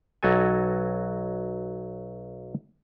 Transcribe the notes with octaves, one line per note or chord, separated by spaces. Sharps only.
B1 F#3 F#4 A4 G#5